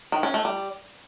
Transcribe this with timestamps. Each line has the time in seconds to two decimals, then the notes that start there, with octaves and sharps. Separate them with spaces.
0.12 D#3
0.23 C#4
0.34 A3
0.45 G3